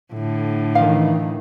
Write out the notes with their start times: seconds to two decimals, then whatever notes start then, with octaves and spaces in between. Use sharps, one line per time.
0.14 A2 D3
0.75 D#3 E3 F5